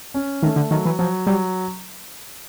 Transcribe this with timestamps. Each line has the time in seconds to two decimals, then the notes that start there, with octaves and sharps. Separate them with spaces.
0.14 C#4
0.42 D#3 A3
0.56 D3
0.71 D#3 F#3
0.85 E3
0.99 F3 F#3
1.27 F#3 G3